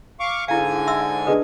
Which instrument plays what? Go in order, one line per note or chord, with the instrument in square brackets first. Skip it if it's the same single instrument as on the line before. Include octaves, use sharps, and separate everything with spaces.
[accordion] F5 C#6 D6
[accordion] G#2 D3 G#5 [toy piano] E4 F5
[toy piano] E5 C6 E6
[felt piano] D4 G#4 D#5 [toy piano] B4